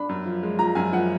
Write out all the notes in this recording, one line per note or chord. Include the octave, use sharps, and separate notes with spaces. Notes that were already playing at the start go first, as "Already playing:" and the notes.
Already playing: D4 B5
F#2
F3
G#3
F3 A#5
F#2 G#5
F3 F#5